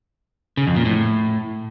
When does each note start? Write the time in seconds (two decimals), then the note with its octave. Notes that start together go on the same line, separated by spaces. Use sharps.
0.57 C#3
0.67 F2
0.76 A#2
0.85 A2